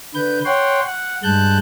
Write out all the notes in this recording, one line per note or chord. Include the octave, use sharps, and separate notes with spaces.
D3 B4 G6
C#5 F#5 G5 C6
F#5
G2 G#3 A5 F#6 G6